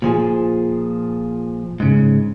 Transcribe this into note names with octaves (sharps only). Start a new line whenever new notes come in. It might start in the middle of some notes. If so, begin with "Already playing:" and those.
A#2 F3 G#4
G#2 C#3